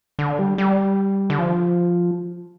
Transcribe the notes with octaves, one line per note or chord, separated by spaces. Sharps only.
D3
G3
G3
D3
F3